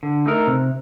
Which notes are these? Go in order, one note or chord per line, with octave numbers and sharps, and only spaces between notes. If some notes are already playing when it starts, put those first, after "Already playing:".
D3
A3 D#4 A#4
C3